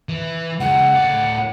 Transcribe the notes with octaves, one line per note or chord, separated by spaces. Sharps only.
E3
C#2 C#3 F#5
A2 D5